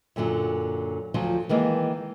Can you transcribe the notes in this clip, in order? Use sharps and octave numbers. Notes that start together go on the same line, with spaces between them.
F#2 A#2 D3 F#3
D2 F3 F#3 F4
D#3 E3 G#3 A#3